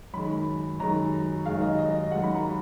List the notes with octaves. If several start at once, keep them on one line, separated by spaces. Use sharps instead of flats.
F#2 D#3 G#3 B5
F#2 D#3 G#3 A#5
F#2 D#3 G#3 F5
D#5
D#5
D#5
F#2 D#3 G#3 F#5
B5
A#5